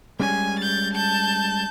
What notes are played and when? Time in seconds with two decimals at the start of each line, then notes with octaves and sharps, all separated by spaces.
0.20 G3 G#3 C#4 G#5
0.59 G6 A6
0.93 A5 G6